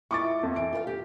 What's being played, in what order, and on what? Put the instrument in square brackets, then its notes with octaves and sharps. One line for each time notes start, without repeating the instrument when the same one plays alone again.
[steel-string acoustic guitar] G#3 E4 F4 [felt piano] C#6 D6 A6
[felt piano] F2
[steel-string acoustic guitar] E3 [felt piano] D7
[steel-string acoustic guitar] F4 B4 F5
G4